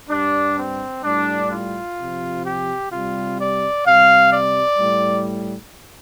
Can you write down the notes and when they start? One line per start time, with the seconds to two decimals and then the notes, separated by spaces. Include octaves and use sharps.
0.09 G2 G3 D4
0.57 C4
1.04 A2 G3 D4
1.50 F4
1.98 C3 F3
2.44 G4
2.91 C3 G3 F4
3.39 D5
3.86 C3 G3 F5
4.32 D5
4.79 A2 G3